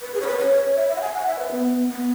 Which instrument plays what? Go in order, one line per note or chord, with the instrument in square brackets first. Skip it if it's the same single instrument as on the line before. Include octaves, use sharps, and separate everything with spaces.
[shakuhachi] B4
G#4
C#5
B4
C#5
E5
E5
F#5
G#5
F#5
E5
B4
B3
B3